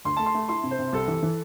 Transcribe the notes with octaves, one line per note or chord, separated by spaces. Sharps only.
D2 C6
A3 A5
C6
A3
E4 C6
C3
C5
C3
C2 A4
E3
E3